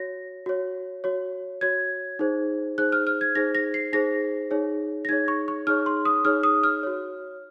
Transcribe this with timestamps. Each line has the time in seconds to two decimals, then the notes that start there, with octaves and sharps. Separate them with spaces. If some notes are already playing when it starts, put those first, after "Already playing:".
Already playing: F#4 C#5 A#6
0.46 F#4 C#5
1.04 F#4 C#5
1.61 F#4 C#5 G#6
2.19 D#4 G#4 C5
2.78 D#4 G#4 C5 F#6
2.92 F6
3.07 F6
3.21 G#6
3.35 D#4 G#4 C5 A#6
3.55 A#6
3.74 C7
3.93 D#4 G#4 C5 A#6
4.51 D#4 G#4 C#5
5.05 A#6
5.09 D#4 G#4 C#5 G#6
5.28 C#6
5.48 C#6
5.67 D#4 G#4 C#5 F6
5.86 C6
6.05 D#6
6.25 D#4 G#4 C#5 F6
6.43 D#6
6.63 F6
6.83 F#4 C#5